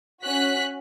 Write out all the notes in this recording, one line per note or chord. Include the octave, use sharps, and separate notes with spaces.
C#4 F#4 F#6 B6